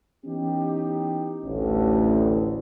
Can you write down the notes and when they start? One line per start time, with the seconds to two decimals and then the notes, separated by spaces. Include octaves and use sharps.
0.25 E3 B3 C#4 D#4 G4
1.43 A1 D2